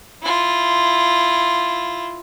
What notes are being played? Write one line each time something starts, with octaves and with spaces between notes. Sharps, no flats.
E4 F4